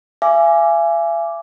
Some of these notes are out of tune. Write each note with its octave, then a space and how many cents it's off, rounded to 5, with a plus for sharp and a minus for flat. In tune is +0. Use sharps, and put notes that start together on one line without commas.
E5 +40 G#5 +0 D6 -5